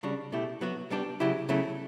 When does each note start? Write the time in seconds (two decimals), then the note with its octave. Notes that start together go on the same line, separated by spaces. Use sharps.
0.03 C#3 G3 D4 F#4
0.32 B2 A3 E4 G4
0.61 F#3 B3 F#4
0.91 G3 B3 D4 G4
1.20 C#3 F#3 C#4 E4 G4
1.49 C#3 F#3 A3 E4